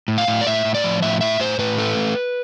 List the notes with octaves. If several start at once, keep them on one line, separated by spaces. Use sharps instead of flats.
A2
F5
A2
D5
A2 E5
A2
D5
F3
A2 E5
A2 E5
A2 C5
A2 B4
A3